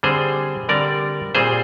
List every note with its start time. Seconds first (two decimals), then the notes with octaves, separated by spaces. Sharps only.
0.03 D3 G3 C4 G#4 C5
0.69 D3 G3 C4 A#4 D5
1.35 A#2 G3 C4 G#4 C5